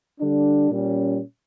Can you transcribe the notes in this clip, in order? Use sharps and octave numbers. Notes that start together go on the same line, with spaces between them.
D3 G3 D4
A#2 G3 C#4